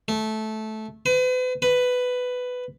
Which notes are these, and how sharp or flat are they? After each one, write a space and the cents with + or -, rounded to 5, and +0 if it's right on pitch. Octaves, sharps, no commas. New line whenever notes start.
A3 -15
B4 +40
B4 +10